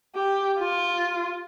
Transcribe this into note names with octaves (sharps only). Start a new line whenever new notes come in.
G4
F4